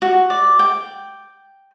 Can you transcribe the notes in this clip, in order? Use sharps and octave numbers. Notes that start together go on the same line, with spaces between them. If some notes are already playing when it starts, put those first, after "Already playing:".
F#4
D5
G5